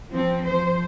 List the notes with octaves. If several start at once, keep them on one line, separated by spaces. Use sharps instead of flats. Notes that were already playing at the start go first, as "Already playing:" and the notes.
F3 C4
F3 C5